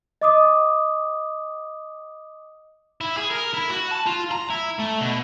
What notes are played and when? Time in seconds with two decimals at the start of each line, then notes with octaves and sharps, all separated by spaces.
0.21 D#5 D6 D#6
3.01 E4
3.17 G#4
3.31 A#4
3.54 E4
3.71 F#4
3.91 A5
4.07 F4
4.31 A#5
4.50 E4
4.79 A3
5.01 B2